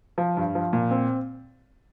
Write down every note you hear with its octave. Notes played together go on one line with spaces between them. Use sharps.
F3
G2
F3
A#2
C4